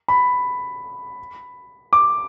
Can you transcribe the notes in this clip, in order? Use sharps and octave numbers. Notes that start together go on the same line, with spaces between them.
B5
D6